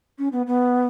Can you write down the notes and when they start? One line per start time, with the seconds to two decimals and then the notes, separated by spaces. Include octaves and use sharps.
0.18 C#4
0.32 B3
0.47 B3